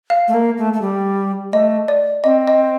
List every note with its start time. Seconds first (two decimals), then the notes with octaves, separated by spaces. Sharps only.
0.10 F5
0.28 A3
0.34 A#3
0.58 A3
0.73 A3
0.82 G3
1.52 A3 D#5
1.88 D5
2.24 C4 D#5
2.48 D#5